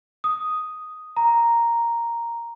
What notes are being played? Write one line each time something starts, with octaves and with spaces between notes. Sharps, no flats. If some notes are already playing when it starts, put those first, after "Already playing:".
D#6
A#5